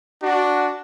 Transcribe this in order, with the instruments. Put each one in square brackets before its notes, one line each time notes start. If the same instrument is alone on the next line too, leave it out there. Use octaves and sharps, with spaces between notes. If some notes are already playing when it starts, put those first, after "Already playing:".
[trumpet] D4 [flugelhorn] F#4